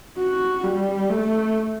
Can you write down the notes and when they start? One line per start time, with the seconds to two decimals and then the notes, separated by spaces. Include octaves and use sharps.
0.18 F#4
0.64 G3
1.10 A3